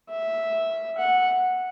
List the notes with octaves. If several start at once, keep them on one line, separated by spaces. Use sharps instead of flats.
E5
F#5